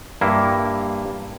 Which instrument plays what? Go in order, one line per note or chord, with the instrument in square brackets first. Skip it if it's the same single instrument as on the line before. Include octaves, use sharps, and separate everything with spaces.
[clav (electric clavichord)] G2 A#3 E4